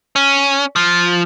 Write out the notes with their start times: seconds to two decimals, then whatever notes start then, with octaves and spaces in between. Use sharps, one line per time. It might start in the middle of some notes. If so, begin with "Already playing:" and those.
0.16 C#4
0.76 F3